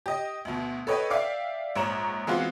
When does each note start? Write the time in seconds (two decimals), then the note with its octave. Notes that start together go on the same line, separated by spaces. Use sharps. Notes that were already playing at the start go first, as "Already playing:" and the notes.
0.06 G4 D#5
0.45 D2 B2
0.87 A4 B4 C#5 D#5 G5
1.10 D5 E5 F5 G5 D6
1.76 A#1 G#2 C#5 A#5 E7 F#7
2.27 E3 G#3 B3 C4 F4 F#4